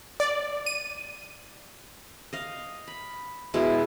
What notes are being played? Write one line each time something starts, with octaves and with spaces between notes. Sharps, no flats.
D5
D#7
D#5 F5
B5
B2 G#3 E4